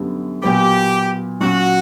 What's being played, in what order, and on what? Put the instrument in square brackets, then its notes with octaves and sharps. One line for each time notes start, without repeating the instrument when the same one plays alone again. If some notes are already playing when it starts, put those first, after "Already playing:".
Already playing: [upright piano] F#2 D3 G3 B3
[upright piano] A#2 F#3 B3 [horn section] G4
[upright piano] A#2 F#3 C#4 [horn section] F#4